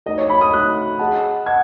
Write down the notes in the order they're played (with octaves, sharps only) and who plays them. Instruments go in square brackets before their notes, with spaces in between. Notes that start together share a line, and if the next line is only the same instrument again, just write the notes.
[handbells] A3 D#4 F#4 A4 [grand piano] D#5
[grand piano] C#5
B5
D#6
[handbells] A3 D#4 F#4 A4 [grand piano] F#6
[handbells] G#4 D#5 F#5 A5
[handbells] D#5 F#5 A5 [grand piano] G#6